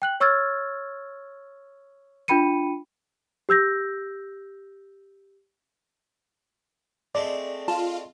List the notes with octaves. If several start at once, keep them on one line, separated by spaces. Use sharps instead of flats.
G5 F#6 F#7
C#5 C#6 E6 F6 G#6 A6
D4 F4 G5 B5 C#7 D#7
G4 E6 G6 A#6
G#3 A3 C4 D5
F4 A5